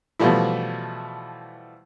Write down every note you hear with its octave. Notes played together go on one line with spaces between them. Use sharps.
B2 E3 F3 G3 A3 E4